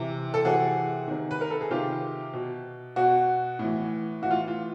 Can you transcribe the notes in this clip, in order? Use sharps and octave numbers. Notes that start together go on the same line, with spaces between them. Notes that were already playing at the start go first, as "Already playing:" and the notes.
Already playing: C3 E3
A4
C3 E3 F#4 G#4
C3 D#3
B4
A#4
A4
G#4
C3 D#3 F4 G4
B2
B2 F#4
A2
E3
A2 E3 F#4
F4
F4